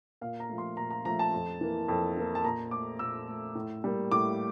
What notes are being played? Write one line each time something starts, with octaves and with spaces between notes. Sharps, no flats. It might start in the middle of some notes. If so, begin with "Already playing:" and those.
A#2 F5
A#5
F3 A3
C6
A#2 A#5
A#5
F3 A3 A#5
A5
F2
E3 A#3
F2
E3 A#3
A5
A#2 A#5
A3 D6
A#2 E6
A3
A2
G3 A#3
A2 D6